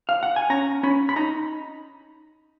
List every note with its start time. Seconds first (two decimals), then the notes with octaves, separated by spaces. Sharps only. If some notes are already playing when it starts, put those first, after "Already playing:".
0.09 F5
0.23 F#5
0.36 G#5
0.50 C#4 A#5
0.83 C#4 B5
1.09 B5
1.16 D#4 A#5